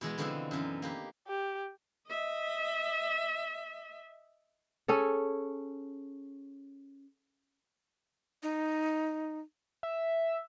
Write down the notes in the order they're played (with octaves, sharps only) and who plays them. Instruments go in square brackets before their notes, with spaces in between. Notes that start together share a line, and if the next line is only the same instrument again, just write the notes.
[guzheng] B2 E3 G#3 B3
B2 D3 E3 F3 C4 E4
F#2 E3 D#4
A#3 G4 B4
[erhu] G4
[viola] D#5 E5
[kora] C#4 G#4 A4
[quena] D#4
[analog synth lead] E5